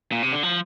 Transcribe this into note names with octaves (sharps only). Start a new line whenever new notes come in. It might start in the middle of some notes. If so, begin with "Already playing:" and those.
A#2
C3
D3
F3